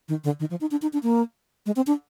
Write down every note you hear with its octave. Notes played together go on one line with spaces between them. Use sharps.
D#3
D3
D#3
F3
D#4
D4
D#4
D4
A#3
G#3
C4
D4